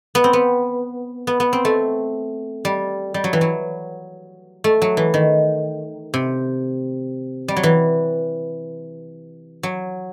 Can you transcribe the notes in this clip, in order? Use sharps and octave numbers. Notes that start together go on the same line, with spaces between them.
B3
C4
B3
B3
B3
C4
A3
G3
G3
F#3
E3
F#3
A3
F#3
E3
D#3
C3
G3
F#3
E3
F#3